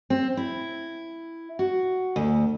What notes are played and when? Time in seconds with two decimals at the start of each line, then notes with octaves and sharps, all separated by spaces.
0.10 C4
0.37 E4
1.59 F#4
2.16 D2